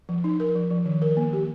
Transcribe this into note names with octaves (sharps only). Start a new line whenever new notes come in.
F3
D#4
A#4
F3
F3
D#3
A#4
A#3
G4